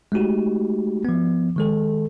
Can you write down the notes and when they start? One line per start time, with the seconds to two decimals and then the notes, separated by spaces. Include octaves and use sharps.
0.12 G#3 A3 D#4 F#4 G4
1.05 F3 B3
1.56 D#3 G#3 A4